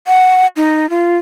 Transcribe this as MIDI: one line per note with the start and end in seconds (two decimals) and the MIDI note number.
0.07 0.47 78
0.56 0.89 63
0.90 1.17 65